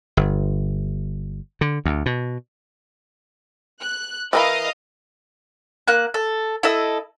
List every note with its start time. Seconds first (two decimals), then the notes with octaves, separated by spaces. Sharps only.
0.17 G1
1.61 D3
1.85 D2
2.06 B2
3.81 F#6
4.33 E3 A#4 D#5 F5 B5 D#6
5.88 A#3 F#6
6.14 A4
6.63 E4 A4 D#5 E6